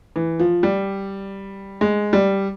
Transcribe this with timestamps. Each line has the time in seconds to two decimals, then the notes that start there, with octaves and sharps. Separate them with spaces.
0.16 E3
0.39 F3
0.63 G3
1.81 G#3
2.13 G3